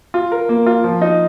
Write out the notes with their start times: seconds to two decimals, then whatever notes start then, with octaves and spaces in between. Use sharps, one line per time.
0.14 F4
0.32 A#4
0.49 A#3
0.66 F4
0.84 F3
1.01 D#4